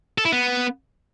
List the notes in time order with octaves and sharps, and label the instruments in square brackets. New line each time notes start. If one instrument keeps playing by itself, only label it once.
[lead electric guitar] A4
E4
B3